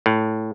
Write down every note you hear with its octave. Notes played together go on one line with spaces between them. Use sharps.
A2